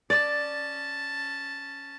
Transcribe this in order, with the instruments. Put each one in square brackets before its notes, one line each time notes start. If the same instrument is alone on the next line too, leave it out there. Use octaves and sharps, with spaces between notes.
[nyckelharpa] C#4 A5 [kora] D5